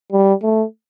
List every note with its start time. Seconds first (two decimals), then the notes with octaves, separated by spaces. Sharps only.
0.12 G3
0.43 A3